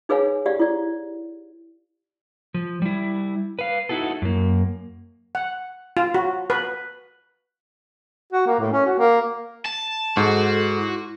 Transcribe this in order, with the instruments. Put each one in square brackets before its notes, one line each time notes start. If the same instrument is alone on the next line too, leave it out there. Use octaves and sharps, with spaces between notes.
[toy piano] D#4 G#4 B4 C#5 F5 G#5
G4 D5 F5
E4 D5
[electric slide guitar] F3
G3 E4
B4 F5
D#4 E4 F#4 A4
F#2 A#3
[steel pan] F#5
F4
F#4
B4
[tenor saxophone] F#4
A#3
A2
C#4
F#4
A#3
[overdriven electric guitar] A5
[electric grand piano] G#2 [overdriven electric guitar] F#4 [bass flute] A4
[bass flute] E4